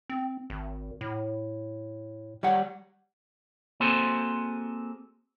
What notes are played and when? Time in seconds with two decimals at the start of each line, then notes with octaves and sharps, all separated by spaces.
0.10 C4
0.50 G#1
1.01 A2
2.43 G3 C#5 F#5
3.80 A#3 C4 F#4 G#4 A4 C5